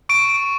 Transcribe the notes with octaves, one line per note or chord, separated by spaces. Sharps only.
C#6 D7